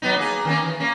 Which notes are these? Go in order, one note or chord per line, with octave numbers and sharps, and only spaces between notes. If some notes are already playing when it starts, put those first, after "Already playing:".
F#3 B3 D#4
A#3 G#4
D#3 A#3 C#4
E3
A#3 C#4